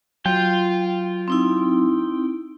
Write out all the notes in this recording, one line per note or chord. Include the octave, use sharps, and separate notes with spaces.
F#3 F4 G5
C4 D#4 E4